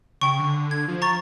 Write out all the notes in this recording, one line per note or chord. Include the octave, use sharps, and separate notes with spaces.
C#3 G5 C#6
D3
G#6
F3
A#5 C#6 A6